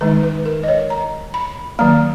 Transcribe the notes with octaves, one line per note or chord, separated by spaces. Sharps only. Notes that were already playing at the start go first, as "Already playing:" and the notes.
D#3 G#3 D#4 B4
B4
A#4
D#5
C#5
A#5
B5
D#3 F#3 A#3 A#5